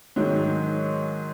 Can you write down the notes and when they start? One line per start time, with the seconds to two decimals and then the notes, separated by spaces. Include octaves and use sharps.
0.16 G#2 D#3 F#3